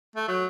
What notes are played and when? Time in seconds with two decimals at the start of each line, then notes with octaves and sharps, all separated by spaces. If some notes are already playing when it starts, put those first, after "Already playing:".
0.16 A3
0.28 F#3